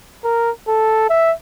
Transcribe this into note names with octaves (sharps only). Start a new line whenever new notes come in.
A#4
A4
E5